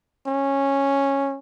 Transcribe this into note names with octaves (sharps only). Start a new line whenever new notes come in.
C#4